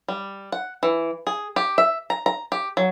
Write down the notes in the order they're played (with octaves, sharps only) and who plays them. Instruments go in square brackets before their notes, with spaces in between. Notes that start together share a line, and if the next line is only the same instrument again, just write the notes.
[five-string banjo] G3
F#5
E3
G#4
G4
E5
A#5
A#5
G4
F#3